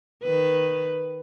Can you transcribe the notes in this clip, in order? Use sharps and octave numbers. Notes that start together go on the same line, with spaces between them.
D#3 B4